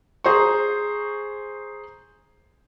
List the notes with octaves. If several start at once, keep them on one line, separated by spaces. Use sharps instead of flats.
G#4 C5 A#5 C#6